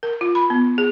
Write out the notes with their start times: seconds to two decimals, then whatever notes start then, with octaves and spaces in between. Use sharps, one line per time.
0.03 A#4
0.21 F4
0.35 B5
0.50 B3
0.78 G#4